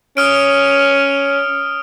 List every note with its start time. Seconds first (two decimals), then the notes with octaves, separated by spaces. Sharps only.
0.17 C#4 D#6 F6 D7